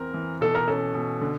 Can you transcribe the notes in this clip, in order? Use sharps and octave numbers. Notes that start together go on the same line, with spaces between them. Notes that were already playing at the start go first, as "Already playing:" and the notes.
Already playing: E2 E3 C4 A#4
E3
B2 A4
A#4
C#4 A4
B2
D3